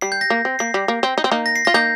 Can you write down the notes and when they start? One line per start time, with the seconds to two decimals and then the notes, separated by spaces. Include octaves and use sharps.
0.01 G3 C7
0.12 G6
0.21 A#6
0.30 A#3
0.45 C4
0.59 A#3 C7
0.74 G3
0.88 A#3
1.03 C4
1.18 D#4
1.24 C4
1.31 A#3 D#4
1.46 A#6
1.56 C7
1.65 F4 A#6
1.74 A#3 D#4 G6